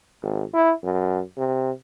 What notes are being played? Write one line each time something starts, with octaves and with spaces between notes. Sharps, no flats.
G#1
E4
F#2
C3